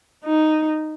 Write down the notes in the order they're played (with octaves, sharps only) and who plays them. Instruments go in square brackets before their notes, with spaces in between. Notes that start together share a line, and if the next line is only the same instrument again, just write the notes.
[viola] D#4